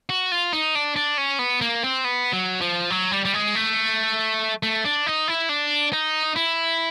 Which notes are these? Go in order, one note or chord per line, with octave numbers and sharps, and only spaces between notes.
F#4
F4
D#4
D4
D4
C#4
B3
A#3
C4
B3
F#3
F3
F#3
G3
G3
G#3
A3
A3
D4
D#4
E4
D4
D#4
E4